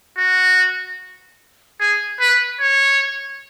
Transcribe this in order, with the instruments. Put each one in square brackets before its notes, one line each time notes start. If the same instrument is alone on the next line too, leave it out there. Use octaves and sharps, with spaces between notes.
[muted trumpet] F#4
G#4
B4
C#5